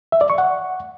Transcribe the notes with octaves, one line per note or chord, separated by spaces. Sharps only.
E5
D5
C#6
F#5